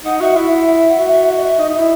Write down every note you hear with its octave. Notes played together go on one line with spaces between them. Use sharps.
D#4 F#5
F#4 E5
E4 E5
F#5
E5
F#5
F#4 E5
E5
E5
D#5
E5
D#4 D#5
D#4
E4 E5